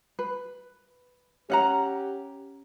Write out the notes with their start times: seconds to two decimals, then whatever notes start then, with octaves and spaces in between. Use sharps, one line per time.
0.19 B4
1.50 C#4 G4 F#5 A#5